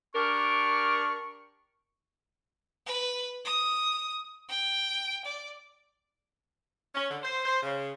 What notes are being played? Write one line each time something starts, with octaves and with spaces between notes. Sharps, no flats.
D4 G4 A#4 C#6
B4
D#6
G5
D5
C#4
D3
C5
C5
C#3